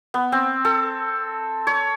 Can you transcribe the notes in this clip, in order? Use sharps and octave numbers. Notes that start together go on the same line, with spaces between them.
B3
C4
A4
C#5